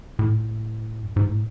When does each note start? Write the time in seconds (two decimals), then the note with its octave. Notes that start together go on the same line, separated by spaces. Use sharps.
0.19 A2
1.04 F#2
1.16 G#2
1.28 A2